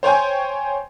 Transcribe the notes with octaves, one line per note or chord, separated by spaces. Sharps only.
C5 C#5 G5 G#5 C#6